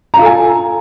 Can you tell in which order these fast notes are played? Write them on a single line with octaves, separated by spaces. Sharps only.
A#5 F4 A4 G#5